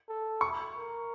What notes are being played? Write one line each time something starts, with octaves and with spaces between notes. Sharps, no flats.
A4
C#6
A#4